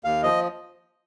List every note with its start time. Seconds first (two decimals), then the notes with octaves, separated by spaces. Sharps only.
0.04 D#2 F5
0.23 F3 D#5